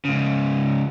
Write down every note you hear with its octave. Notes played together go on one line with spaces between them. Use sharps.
G#2 C#3